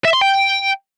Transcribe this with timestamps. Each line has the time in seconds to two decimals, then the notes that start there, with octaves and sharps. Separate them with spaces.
0.05 E5
0.13 C6
0.21 G5